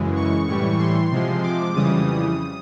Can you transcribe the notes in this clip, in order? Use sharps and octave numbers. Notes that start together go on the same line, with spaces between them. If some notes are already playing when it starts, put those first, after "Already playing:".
Already playing: F#2 C#3 E3 G#3
C#6
A2 E3 G3 C#6
C6
C3 F3 G#3
D6
F2 C#3 E3 G3 D#6